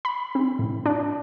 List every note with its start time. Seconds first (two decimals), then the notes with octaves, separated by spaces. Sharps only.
0.05 B5
0.35 C4
0.59 A2
0.86 D4